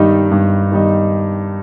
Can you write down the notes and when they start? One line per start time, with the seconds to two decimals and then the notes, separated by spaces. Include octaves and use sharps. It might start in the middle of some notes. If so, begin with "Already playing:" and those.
Already playing: G2 D#3 G3 D#4
0.31 G2
0.71 D#3 G3 D#4